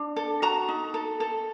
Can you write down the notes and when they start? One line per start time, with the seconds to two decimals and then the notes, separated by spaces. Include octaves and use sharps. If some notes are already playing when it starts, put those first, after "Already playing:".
Already playing: D4
0.16 A4
0.42 F#4 A#5
0.69 D#4
0.94 A4
1.20 A4